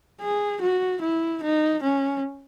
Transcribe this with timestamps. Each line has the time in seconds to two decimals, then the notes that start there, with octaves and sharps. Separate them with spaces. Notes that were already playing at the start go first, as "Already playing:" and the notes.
0.21 G#4
0.61 F#4
1.02 E4
1.43 D#4
1.83 C#4